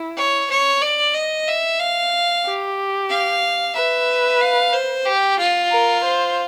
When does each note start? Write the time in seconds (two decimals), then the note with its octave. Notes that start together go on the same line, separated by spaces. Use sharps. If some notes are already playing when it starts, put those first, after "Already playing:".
Already playing: E4
0.17 C#5
0.50 C#5
0.82 D5
1.14 D#5
1.47 E5
1.80 F5
2.45 G4
3.10 F5
3.75 B4 E5
4.41 F5
4.73 C5
5.05 G4
5.39 F4
5.71 A#4
6.04 C5